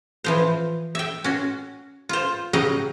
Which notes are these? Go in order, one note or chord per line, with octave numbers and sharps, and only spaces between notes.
E3 F3 C5
E5 G5
C#4 F#4
F4 C5
C#3 F#3 G4 D#5 F5 F#5